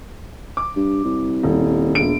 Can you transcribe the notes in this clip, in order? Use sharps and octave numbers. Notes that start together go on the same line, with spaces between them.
D6
G2
C2
D#1
E1 A#1 D7